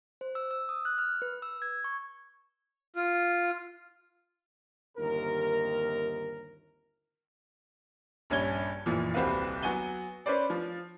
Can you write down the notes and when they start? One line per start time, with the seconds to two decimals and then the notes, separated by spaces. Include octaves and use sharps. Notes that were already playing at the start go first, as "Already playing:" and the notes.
0.21 C5
0.35 E6
0.51 E6
0.69 D#6
0.85 F#6
0.98 F6
1.22 B4
1.42 E6
1.62 G#6
1.84 C#6
2.96 F4
4.98 G1 D#2 C3 A#4
8.30 A#1 G2 C#4 G#5 G#6 G7
8.86 F#1 A#2 E3 F3
9.14 D#1 C2 C4 F#4 B4 F5
9.62 F#3 B3 F#4 G#5 G7
10.26 C#4 B4 C5 D5
10.50 F3